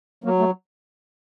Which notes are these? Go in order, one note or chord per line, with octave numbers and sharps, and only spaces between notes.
F#3 A#3
A3